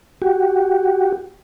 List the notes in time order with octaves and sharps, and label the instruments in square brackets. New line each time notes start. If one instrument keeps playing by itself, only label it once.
[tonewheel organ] F#4 G4